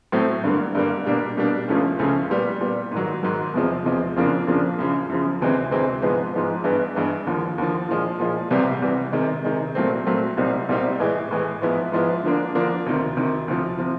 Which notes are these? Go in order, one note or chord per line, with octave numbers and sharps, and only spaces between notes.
A2 F#3 A3 C4
G2 D3 G3 A#3
G2 D3 G3 A#3
B2 G3 A#3 D4
B2 G3 A#3 D4
C#2 C#3 F3 A3 C#4
C#2 C#3 F3 A3 C#4
A#2 G3 B3
A#2 G3 B3
G#2 D#3 F#3
G#2 D#3 F#3
E2 C3 F3 G#3
E2 C3 F3 G#3
F2 C#3 F3 A#3 D4
F2 C#3 F3 A#3 D4
F#2 C#3 F3
F#2 C#3 F3
D2 C3 E3 G#3 C4
D2 C3 E3 G#3 C4
G#2 F3 G#3 B3
G#2 F3 G#3 B3
G2 E3 G#3 B3
G2 E3 G#3 B3
D#2 D3 F3
D#2 D3 F3
A#2 F3 G#3
A#2 F3 G#3
C2 C3 E3 G3
C2 C3 E3 G3
C3 D#3 G#3
C3 D#3 G#3
A#2 F#3 A3 C4
A#2 F#3 A3 C4
C2 A#2 G3 C4 D#4
C2 A#2 G3 C4 D#4
A2 E3 G#3
A2 E3 G#3
G#2 F3 G#3 B3 E4
G#2 F3 G#3 B3 E4
D3 F3 A#3 D4
D3 F3 A#3 D4
D2 C3 D#3
D2 C3 D#3
D2 C3 F3
C3 F3